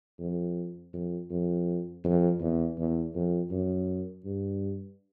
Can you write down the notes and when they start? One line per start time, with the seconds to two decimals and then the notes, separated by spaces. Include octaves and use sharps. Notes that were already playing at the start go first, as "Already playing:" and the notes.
0.19 F2
0.93 F2
1.30 F2
2.04 F2
2.41 E2
2.78 E2
3.15 F2
3.51 F#2
4.25 G2